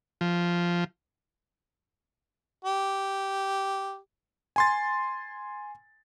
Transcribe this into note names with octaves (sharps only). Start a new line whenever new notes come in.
F3
G4
G#5 C6 A6